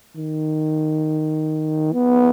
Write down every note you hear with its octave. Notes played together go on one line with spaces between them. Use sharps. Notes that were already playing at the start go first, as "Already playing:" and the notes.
D#3
B3